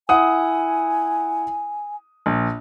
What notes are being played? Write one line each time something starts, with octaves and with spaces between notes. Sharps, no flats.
E4 F#5 G#5 D#6
A#1